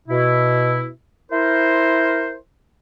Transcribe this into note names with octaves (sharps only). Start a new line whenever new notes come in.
B2 E4
E4 A#4 C5